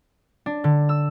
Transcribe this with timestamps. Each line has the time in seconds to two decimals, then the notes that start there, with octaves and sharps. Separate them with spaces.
0.46 D4
0.64 D3
0.89 E6